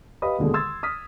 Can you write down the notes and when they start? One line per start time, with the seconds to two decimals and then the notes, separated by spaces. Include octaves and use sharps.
0.22 G4 B4 D#5 F5 B5 D#6
0.38 D#2 B2 D3 G#3
0.54 C6 E6 G#6 A6
0.83 D#6 F6 B6